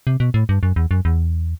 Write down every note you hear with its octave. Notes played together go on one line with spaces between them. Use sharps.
C3
B2
A2
G2
F#2
E2
F#2
E2